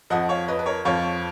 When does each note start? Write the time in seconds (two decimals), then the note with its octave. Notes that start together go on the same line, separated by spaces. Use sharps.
0.10 F2 F3 D#5 F#5
0.29 C#5 F5
0.48 B4 D#5
0.59 B4
0.66 A#4 C#5
0.85 F2 F3 C#5 F5